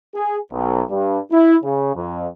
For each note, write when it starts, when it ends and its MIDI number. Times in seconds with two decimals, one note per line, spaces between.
0.15 0.38 68
0.52 0.83 35
0.90 1.19 43
1.32 1.56 64
1.64 1.93 49
1.95 2.27 41